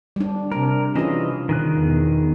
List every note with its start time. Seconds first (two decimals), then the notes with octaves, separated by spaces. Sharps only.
0.16 G3 D4
0.52 C3 D4 A#4
0.96 E3 C#4 F4 G#4 D#5
1.49 B2 D#3 G#4 F#6
1.78 E2 B2